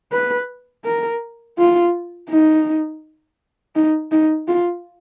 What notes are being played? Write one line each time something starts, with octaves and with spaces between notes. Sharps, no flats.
B4
A#4
F4
D#4
D#4
D#4
F4